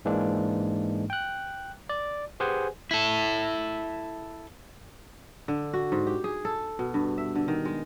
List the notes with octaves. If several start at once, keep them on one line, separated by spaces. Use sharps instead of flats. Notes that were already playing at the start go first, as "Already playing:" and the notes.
G#2 E3 G#3 A#3 D4
G5 F#6
D5
G4 G#4 B4 C5 F#5 G#5
E4 A4
D3
F#4
G#2
G4
G#4
A4
B2
G2
E5
D3
D#3
G#3